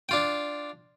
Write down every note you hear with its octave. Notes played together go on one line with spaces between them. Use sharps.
D4 F4 G5